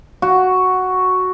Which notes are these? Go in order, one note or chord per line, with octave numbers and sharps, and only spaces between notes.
F#4